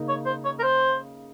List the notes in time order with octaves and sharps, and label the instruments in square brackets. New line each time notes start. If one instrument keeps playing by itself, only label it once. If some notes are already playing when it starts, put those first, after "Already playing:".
Already playing: [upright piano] C#3 A#3 D#4
[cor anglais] C#5
C5
C#5
A#4
C5